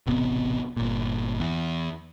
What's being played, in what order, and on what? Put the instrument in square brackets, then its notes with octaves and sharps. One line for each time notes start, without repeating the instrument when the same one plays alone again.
[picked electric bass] E1 A1 C3 B3
G1 A#2
E2